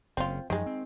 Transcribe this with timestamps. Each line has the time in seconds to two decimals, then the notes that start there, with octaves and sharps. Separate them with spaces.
0.17 F#1 C#3 C4 F4
0.50 F#2 D#3 F3 G#3
0.66 C4